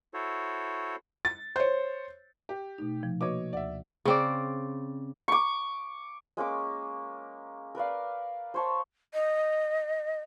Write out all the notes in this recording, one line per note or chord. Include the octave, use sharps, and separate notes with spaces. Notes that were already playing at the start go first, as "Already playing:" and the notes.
E4 F#4 A4 C5 C#5
A6
C5 C#5
G4
B2 A3 D#4
C3 F3
A#3 F#4 B4 C#5 D#5 D6
D2 D5 E5 F#5
C#3 C4 D5
C#6 D6
G#3 A#3 C#4 D6
A#4 B4 D5 F5
C5 C#5 A5
D#5